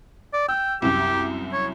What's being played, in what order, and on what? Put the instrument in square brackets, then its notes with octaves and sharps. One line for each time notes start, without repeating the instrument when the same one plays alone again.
[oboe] D5
[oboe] G5 [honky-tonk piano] E6
[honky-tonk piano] C2 F#2 [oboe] G4
[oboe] C#5